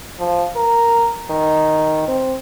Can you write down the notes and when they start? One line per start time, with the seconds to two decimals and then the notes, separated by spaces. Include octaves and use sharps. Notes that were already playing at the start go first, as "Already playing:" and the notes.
0.20 F3
0.56 A#4
1.30 D#3
2.08 C4